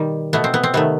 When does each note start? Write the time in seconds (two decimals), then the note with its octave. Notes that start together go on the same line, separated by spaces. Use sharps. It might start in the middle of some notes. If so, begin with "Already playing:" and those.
Already playing: B2 D#3 G3
0.33 B2 A3 B3
0.44 C4
0.54 B3
0.63 C4
0.74 C3 D#3 A3 B3